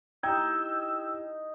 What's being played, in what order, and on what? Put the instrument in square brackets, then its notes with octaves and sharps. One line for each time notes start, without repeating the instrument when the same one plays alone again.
[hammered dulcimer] D#4 [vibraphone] E4 G4 [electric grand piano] G5 G#6 [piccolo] E6